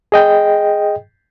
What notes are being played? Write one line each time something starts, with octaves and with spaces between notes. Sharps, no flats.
G#4 D#5 G5